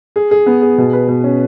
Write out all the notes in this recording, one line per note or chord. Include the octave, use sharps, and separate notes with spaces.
G#4
G#4
B3
G#4
B2
B4
B2
C#4